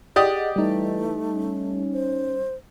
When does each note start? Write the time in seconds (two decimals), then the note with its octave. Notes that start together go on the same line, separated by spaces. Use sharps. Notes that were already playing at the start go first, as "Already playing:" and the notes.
0.16 G4 G#4 D5 D#5 F#5 D#6
0.56 E3 G3 A3 D#4
1.34 C#4
1.94 C5